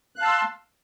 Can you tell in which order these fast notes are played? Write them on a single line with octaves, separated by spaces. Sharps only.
F#6 F5 A5 E6 C6